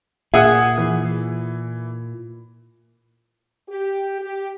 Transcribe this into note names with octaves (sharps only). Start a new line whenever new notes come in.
A#2 G#4 E5 F#5
E3
G4
G4